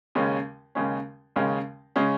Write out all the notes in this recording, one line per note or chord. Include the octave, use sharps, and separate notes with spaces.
D#2 C#3 G#3 C#4
D#2 C#3 G#3 C#4
D#2 C#3 G#3 C#4
C#3 G#3 C#4